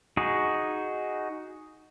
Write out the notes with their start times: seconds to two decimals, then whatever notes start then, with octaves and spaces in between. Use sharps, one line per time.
0.17 D#4 F#4 G#4